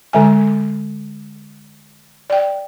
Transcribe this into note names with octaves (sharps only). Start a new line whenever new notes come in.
D3 G#3 G#5
D5 G5